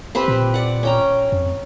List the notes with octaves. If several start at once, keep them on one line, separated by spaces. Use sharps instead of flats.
C4 G4 B4
A#2
D5 F#5
C#4 G5 A#5
F2